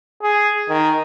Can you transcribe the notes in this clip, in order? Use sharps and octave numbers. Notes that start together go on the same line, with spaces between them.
G#4
D#3